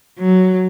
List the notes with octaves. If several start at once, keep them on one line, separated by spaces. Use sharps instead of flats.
F#3